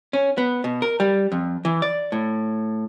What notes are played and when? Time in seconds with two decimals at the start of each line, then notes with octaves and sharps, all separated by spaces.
0.13 C#4
0.38 B3
0.64 B2
0.82 A#4
1.00 G3
1.32 F2
1.65 E3
1.82 D5
2.12 A2